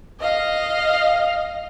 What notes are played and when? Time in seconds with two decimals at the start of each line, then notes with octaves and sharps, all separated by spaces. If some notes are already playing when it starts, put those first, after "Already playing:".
0.20 D#5 F5